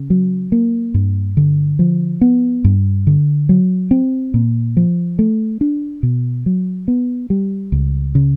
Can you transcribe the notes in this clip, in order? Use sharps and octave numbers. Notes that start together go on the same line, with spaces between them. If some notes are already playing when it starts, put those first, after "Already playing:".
Already playing: C#3
F#3
A#3
G2
D3
F3
B3
G2
D3
F#3
C4
A#2
F3
A3
D4
B2
F#3
B3
G3
C#2
C#3